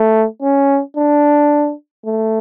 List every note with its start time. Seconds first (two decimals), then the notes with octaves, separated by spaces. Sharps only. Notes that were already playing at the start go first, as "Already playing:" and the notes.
Already playing: A3
0.42 C#4
0.97 D4
2.05 A3